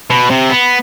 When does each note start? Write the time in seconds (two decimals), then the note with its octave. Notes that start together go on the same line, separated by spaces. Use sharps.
0.10 B2
0.30 C3
0.50 B3